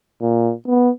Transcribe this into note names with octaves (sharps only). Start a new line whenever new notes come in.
A#2
B3